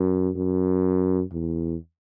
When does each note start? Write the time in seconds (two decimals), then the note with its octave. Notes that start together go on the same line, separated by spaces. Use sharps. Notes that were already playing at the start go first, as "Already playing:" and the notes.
Already playing: F#2
0.36 F#2
1.32 E2